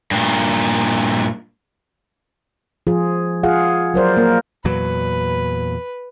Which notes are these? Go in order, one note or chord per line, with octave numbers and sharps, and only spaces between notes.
G2 A#2
F3 F4 G#4
F4 G#4 F5 F#5
F#3 A#4 C5 D5
A#3 A#4
E2 A#2 F#3 B4